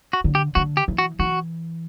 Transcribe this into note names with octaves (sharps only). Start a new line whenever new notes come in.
F#4
D3
G4
D3 F#4
G4
E3
F#4
E3 F#4